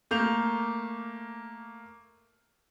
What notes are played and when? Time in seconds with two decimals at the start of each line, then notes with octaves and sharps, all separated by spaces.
0.11 A3 A#3 G6 F7